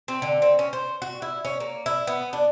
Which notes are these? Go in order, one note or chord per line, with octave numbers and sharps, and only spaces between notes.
C4
D3
C4
C#4
C5
F#4
E4
C#4
A#3
E4
B3
D4